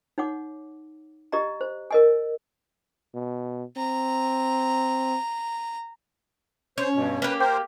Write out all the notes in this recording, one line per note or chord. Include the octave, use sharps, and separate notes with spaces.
D#4 C#5 F#5 D6
G4 D5 D#5 A#5
C5
A#4 D#5 G#5
B2
C4 A#5
C#4 C5 C#5
G2 B2
A#3 G4 B4
A#4 C5 G5 D6 G6